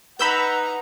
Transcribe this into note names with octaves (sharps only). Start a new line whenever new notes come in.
D#4 B4 F#5 A#5 B5 E6 G6